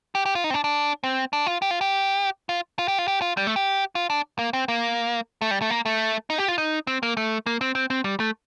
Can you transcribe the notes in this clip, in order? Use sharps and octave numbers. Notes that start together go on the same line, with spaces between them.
G4
G4
F4
D#4
C4
D4
D4
C4
D4
F4
G4
F4
G4
F4
F4
G4
F4
G4
F4
G3
A3
G4
F4
D4
A#3
C4
A#3
A3
G3
A3
A#3
A3
D#4
G4
F4
D#4
C4
A#3
A3
A#3
C4
C4
C4
G3
A3